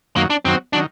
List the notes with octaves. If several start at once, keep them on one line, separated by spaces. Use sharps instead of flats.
F#2 D#3 F#3 A#3
D4
F#2 D#3 F#3 C4
D#3 F#3 D4